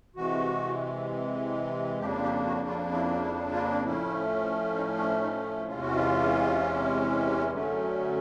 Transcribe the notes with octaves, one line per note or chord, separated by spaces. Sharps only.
C3 E3 G#3 F#4
F2 C#3 F3 A#3 D4 G4
G4
F#4
F4
E4
E4
F4
A2 F3 A3 C#4 E4
D#4
D4
D#4
E2 C3 E3 G#3 C#4 F4
F#4
F4
F#2 D3 F#3 A3 C#4